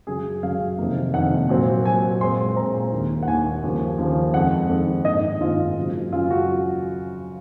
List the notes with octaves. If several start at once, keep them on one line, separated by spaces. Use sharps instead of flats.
F#2 C#3 F#3 G#4
F#2 C#3 F#3 F5
F2 C3 D#3 A#3
F2 C3 D#3 A#3 F#5
A#2 F#3 C4
A#2 F#3 C4 G#5
A#2 G#3 C4 C6
A#2 G#3 C4 A#5
D#2 D#3 A#3
F#5
D#2 D#3 A#3 G#5
D#2 C#3 F3 A#3
D#2 C#3 F3 A#3
F2 D#3 G#3 F#5
F2 D#3 G#3
G#2 D#3 A#3 D#5
G#2 D#3 A#3 F4
F#2 C#3 F#3
F#2 C#3 F#3 F4
F#4